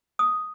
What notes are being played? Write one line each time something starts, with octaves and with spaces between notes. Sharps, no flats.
D#6